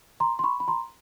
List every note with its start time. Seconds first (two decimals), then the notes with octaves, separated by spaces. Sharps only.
0.20 A#5 C6
0.39 C6
0.44 B5 C#6
0.60 B5
0.68 A#5 C6